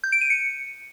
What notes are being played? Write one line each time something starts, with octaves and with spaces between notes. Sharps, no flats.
G6
D7
D#7
C#7